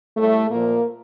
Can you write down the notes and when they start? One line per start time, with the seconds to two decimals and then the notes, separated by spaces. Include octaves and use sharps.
0.17 A2 G3 A3
0.49 A#2 F3 A#3